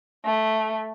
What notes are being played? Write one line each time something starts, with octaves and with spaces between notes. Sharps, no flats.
A3